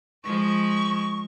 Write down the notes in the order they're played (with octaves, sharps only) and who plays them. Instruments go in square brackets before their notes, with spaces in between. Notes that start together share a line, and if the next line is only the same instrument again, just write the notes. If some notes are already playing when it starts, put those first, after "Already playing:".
[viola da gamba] F3 G#3 [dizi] C#6